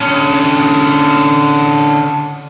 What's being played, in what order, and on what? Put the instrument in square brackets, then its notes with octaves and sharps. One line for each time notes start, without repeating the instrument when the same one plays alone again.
[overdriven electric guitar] D3 C#4